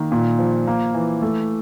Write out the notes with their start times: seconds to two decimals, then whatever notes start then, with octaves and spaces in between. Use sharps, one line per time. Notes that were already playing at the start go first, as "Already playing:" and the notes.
Already playing: D#3 A#3
0.12 A#2
0.39 F3
0.67 A#3
0.94 E3
1.22 A3